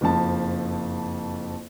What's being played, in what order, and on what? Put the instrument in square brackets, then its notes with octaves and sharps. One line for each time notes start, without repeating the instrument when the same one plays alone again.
[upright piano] F#1 F2 F3 A5